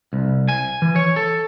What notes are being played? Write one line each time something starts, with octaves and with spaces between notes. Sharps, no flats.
C2
G#5
E3
C#5
A4